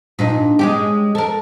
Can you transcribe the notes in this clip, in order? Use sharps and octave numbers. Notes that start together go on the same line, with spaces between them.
A#2 D4 D#4
G#3 C#4 G4
A4 A#4